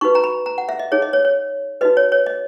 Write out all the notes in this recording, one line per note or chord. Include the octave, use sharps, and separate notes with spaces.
D#4 F#4 B4 C#6
A#5
B5
A#5
F#5
E5
D#5
D#4 G#4 C#5
D#5
C#5
C#5
D#4 F#4 B4 D#5
C#5
C#5
D#5